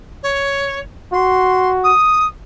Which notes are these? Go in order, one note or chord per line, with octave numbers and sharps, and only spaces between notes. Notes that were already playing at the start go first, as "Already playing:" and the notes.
C#5
F#4 C6
D#6